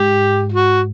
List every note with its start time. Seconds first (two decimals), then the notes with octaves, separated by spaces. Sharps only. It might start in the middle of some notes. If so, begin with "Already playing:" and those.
Already playing: G#2 G4
0.52 F#4